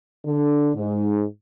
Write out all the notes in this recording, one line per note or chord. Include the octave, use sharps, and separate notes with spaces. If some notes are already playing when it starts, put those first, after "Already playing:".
D3
G#2